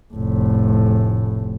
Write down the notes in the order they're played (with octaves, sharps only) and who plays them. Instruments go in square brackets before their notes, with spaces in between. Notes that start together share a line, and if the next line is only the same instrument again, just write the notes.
[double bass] F1 A2